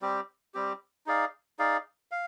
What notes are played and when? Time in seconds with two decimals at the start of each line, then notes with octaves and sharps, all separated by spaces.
0.02 G3 C4 G4
0.54 G3 C4 G4
1.06 D#4 G#4 D5 F5
1.59 D#4 G#4 D5 F5
2.11 F5